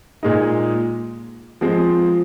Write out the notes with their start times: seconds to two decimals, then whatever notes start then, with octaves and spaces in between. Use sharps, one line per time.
0.23 A#2 G#3 D#4
1.61 F3 G#3 C4